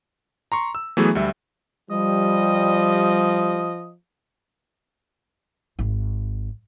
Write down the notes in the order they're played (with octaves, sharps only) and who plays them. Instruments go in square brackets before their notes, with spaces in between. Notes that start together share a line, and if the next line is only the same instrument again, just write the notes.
[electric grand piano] A#5 C6 C#6
E6
E3 F#3 A3 B3 G#4
D2 G3 E5
[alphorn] F3 [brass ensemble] G3 [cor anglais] D#5
[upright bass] G#1